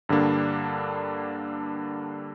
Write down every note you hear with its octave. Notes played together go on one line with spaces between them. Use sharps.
G2 D3 G3 A#3 D4